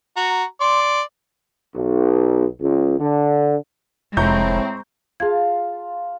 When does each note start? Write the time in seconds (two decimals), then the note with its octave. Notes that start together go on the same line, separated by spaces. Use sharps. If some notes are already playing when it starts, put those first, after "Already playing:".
0.17 F#4 A#5
0.61 D5 C6
1.75 B1
2.60 C#2
2.98 D3
4.17 F1 A2 G#3 C4 A#5 C#6 G6
5.20 F4 G#4 F5 A5 G#6